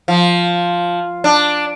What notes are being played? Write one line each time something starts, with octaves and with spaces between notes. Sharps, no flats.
F3
D4